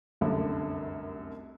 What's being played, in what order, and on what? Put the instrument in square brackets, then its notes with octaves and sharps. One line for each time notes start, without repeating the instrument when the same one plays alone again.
[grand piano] F1 C2 F#2 D3